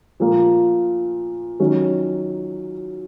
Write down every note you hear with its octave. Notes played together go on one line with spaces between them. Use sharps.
A#2 F3 A#3
D#3 F#3 C#4